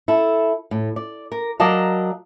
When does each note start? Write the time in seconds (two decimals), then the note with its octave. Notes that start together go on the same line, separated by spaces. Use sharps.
0.08 E4 A4
0.71 A2
0.96 D5
1.32 A#4
1.60 F#3 A#4 D5 D#5 F5 A5